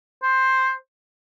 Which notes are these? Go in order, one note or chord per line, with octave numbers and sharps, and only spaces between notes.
C5